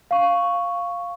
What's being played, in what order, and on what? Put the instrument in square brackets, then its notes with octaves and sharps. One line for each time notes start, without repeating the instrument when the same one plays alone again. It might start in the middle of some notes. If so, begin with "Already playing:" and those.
[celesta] F5 C#6